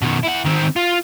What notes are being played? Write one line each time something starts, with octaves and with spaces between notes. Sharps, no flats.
B2 D#3
E4 F#5
D#3 C4
F4